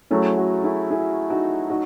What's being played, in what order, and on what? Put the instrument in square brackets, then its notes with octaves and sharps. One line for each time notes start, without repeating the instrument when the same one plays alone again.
[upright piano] F#3 A3 C#4 [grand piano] E4 G#4
[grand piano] F#4 A4
E4 G#4
E4 G#4
D#4 F#4
D#4 F#4